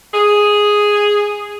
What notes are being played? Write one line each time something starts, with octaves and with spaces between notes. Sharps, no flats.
G#4